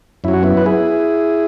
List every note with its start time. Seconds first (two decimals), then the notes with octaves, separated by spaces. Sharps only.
0.24 F#2 F#3 E4
0.33 F#4
0.43 B3 E4
0.57 B4
0.66 E4 G#4